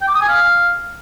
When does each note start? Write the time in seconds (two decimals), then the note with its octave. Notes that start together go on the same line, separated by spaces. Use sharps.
0.01 G5
0.08 D6
0.15 D#6
0.22 G#5
0.28 F5